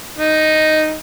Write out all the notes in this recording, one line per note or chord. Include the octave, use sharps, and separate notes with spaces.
D#4